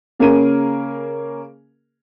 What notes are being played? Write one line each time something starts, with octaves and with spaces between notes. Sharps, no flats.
C#3 A#3 C#4 G#4 A#4 D#7